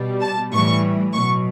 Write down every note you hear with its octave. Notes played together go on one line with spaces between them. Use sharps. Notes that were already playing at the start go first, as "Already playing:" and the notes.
Already playing: B2 G3
A5
A2 E3 G3 C#6
B2 F#3 C#6